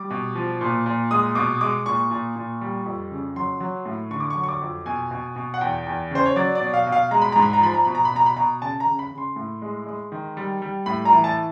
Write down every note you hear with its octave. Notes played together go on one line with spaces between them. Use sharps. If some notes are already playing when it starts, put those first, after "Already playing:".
Already playing: G3 D6
B2
F3
A#2
A#2
G#3 D#6
B2 D6
G#3 D6
A#2 C#6
A#2
A#2
G3
F2
C#3
F#3 C6
F#3
A2
D3 C#6
D6
C#6
F#3
C#6
D6
F2
B2 G#5
B2
B2
F#5
E2 G5
E2
C#3 C5
C#5
F#3 D5
D5
B2
F5
B2
F5
G#3 A#5
B5
G#2 A#5
B5
A#5
F3 B5
A#5
B2 B5
A#5
B5
B2 A#5
B5
B2 A#5
C#3 A5
A#5
C#3
B5
C#3
C6
A2
G#3
G#3
D#3
G3
G3
A2 B5
A#5
E3
A5